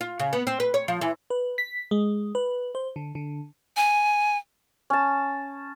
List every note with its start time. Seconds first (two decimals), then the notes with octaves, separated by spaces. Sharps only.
0.01 F4
0.19 C#3
0.33 B3
0.47 C4
0.60 B4
0.74 C#5
0.88 F3
1.01 E3
1.30 B4
1.58 B6
1.91 G#3
2.35 B4
2.75 C5
2.96 D3
3.15 D3
3.77 G#5
4.90 C#4 A5